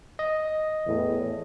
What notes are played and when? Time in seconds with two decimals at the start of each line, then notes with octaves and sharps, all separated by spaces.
0.19 D#5
0.85 E2 A2